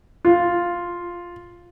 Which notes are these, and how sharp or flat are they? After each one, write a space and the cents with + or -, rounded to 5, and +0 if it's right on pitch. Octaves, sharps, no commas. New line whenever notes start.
F4 +0